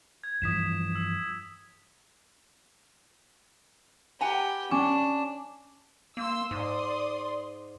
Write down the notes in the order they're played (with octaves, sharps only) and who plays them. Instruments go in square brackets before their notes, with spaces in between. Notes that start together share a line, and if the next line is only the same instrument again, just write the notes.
[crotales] G#6
[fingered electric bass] G2 E3 F3 [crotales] D#6 B6 E7
[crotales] E6
[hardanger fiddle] G4 B4 [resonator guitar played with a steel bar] F#5 G#5 A#5
[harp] C#4 [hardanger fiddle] D4 [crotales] D6
[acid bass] A#3 [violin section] C6 E6
[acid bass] G#2 [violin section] D5 C6 D#6